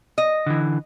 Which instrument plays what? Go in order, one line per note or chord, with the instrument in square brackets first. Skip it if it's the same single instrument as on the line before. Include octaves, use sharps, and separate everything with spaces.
[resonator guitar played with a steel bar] D#5
[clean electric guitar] D3 E3